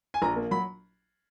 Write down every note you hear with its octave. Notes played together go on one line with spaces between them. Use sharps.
G#5
A#1 A#5
A#3
F#3 B5